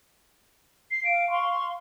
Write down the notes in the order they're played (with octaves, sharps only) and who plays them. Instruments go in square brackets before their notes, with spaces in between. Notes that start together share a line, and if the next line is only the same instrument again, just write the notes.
[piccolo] C7
[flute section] F5 [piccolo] D7
[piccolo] F5 [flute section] C6 C#6